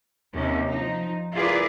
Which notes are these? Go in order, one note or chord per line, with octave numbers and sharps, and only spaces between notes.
D#2 C3 C#4 D#5
F3 D#4
E4 F4 G#4 A#4 B4 D5